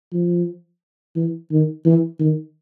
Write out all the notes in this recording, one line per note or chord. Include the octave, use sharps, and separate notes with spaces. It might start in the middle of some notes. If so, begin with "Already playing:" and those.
F3
E3
D#3
E3
D#3